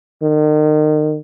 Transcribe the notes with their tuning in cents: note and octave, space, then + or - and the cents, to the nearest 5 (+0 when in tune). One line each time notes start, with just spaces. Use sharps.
D#3 -35